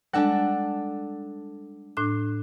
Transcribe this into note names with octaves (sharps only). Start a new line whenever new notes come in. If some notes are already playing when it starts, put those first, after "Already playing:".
G3 G#3 D4 A4 F#5
A2 D4 F#6